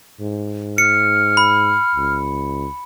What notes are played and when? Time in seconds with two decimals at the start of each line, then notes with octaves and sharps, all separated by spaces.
0.20 G#2
0.78 F6 C#7
1.37 B5
1.96 C#2